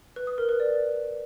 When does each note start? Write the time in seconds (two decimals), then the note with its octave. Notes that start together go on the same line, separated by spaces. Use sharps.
0.16 B4
0.27 D#6
0.38 A#4
0.49 B4
0.60 D5